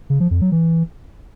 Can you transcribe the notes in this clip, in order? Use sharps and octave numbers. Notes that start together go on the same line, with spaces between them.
C#3
F3
F2
F#3
E3